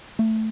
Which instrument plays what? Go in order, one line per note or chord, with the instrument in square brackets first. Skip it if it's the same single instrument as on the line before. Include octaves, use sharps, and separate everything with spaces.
[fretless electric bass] A3